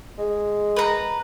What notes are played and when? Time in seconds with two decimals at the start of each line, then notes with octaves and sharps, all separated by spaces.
0.18 G#3
0.76 B4 A#5